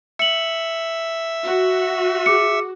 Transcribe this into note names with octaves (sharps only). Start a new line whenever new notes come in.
E5 C#7 F#7
F#4
G#4 D6 C#7